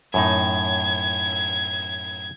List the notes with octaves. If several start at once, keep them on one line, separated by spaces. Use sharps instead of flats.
F#2 A2 D#4 G#6